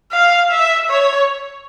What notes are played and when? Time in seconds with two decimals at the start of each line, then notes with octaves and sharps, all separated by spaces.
0.12 F5
0.51 E5
0.89 C#5